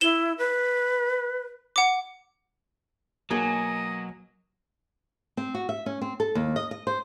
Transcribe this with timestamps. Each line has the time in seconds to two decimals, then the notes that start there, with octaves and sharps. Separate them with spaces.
0.01 E4 E7 G7
0.38 B4
1.76 F#5 D6
3.30 B2 F#3 A#3 G#4 D#5 F#5
5.37 C4
5.54 F#4
5.69 E5
5.86 C#4
6.01 C4
6.20 A4
6.35 D#2
6.56 D#5
6.71 D#5
6.87 C5